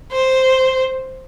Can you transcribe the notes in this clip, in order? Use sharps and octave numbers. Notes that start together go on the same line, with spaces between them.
C5